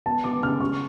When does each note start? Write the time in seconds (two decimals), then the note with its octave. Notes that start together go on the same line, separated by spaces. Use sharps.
0.06 B3 A5
0.24 B3 D6
0.43 C#3 F6
0.61 C#4 C#6